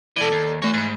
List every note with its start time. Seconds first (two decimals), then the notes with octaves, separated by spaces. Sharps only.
0.16 B2 E3 A4 D5
0.32 D#2
0.62 E3 A3 A#4 C#5 A#6
0.74 G#2 B5 F#6